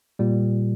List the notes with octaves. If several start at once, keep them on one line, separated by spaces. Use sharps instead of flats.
A#2 G3